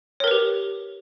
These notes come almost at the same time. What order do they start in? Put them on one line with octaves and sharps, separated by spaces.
C#5 A#4 B4 G4